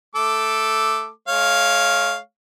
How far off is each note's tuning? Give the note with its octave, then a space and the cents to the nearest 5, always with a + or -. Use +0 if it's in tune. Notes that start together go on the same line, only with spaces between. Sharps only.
A3 +0 A4 +0 D6 +0
G#3 +45 C#5 +0 F5 +0